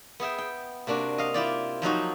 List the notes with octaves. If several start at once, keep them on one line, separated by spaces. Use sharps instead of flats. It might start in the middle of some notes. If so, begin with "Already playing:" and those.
B3 G#4 E5 G5
G5
C3 A#3 D4 F#4
D#5 F5
E4 F4 G4 D5
F3 F#3 D#4 F#4